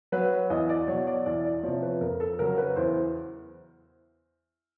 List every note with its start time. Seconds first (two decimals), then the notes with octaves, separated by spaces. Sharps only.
0.12 F#3 B4
0.50 E2 D#5
0.69 D5
0.88 B2 F#3 C#5
1.07 D5
1.26 E2 D5
1.45 D5
1.63 C3 F3 C#5
1.82 B4
2.01 F2 A#4
2.20 A4
2.39 C#3 F#3 A#4
2.58 B4
2.76 E2 C5